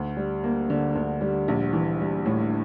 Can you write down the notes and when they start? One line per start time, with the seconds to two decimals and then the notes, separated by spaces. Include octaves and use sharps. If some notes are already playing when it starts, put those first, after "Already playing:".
Already playing: D2
0.17 G3
0.44 A#3
0.70 D3
0.95 D2
1.21 G3
1.48 A#1
1.73 E3
2.00 G3
2.26 A2